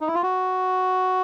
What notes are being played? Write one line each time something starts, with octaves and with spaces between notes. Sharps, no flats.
D#4
E4
F4
F#4